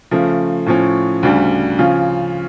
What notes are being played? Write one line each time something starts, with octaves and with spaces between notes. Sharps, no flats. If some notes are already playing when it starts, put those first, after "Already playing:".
C#3 F3 A3
A2 F3 C#4
D2 C#3 G3 D4
C#3 F3 C#4 F4